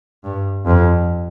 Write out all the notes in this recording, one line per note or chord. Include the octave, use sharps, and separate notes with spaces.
G2
F2